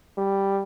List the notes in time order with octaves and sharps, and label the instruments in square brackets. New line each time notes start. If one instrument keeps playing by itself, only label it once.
[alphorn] G3